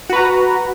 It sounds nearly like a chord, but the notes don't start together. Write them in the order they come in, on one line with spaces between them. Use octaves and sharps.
F#4 B4 A#5